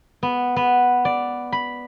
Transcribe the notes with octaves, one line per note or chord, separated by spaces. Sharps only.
B3
B3
D5
B5